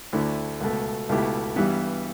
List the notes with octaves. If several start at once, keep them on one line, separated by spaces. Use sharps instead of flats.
D2 D3 A3 E4
C#2 B2 A3
C#2 B2 A3 E4 G4
G2 E3 G3 B3